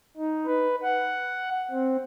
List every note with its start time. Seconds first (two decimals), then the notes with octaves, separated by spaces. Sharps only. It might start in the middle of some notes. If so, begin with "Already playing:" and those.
0.16 D#4
0.46 B4
0.82 F#5
1.70 C4